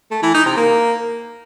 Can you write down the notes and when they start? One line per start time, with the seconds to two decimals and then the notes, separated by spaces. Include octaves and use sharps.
0.11 A3
0.23 E3
0.34 D#4
0.46 C3
0.57 A#3